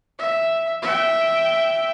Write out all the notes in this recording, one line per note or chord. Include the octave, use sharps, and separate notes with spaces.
E5
E5 G5